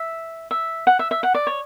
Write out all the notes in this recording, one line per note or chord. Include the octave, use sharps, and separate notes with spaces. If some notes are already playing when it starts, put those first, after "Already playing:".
Already playing: E5
E5
F#5
E5
E5
F#5
D5
C#5